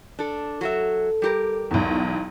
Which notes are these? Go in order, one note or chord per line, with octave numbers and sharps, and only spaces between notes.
D4 A4
F#3 F#4 A4 E5
G3 G4 A#4
B1 E2